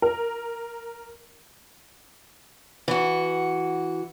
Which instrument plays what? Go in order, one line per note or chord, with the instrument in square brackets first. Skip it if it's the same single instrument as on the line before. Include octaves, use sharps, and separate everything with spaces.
[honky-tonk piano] A#4
[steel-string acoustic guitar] E3 F#4